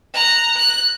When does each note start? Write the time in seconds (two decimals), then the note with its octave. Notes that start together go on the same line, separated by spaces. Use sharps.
0.14 A#5 F#6
0.56 F#6